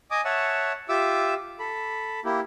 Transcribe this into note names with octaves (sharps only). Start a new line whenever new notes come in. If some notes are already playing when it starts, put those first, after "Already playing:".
D#5 G#5 D6 D#6
C#5 E5 F#5 A5 C#6
F4 G4 E5 D6 E6
A4 B5
A#3 E4 G4